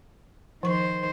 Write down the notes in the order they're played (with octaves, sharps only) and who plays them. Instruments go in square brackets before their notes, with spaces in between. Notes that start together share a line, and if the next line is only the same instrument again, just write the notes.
[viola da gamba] D#3 C5 [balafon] F3 C#6